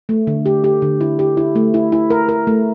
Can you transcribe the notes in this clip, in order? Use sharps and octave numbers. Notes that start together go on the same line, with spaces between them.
A3
D3
G4
G4
D3
E4
G4
E4
A3
E4
E4
A#4
A#4
A3